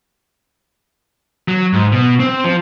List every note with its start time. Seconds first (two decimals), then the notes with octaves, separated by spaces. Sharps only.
1.48 F#3
1.73 G#2
1.92 B2
2.20 C4
2.44 F3